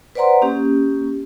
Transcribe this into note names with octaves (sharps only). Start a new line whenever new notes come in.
B4 C5 D5 F#5 A#5 C6
A#3 C#4 G4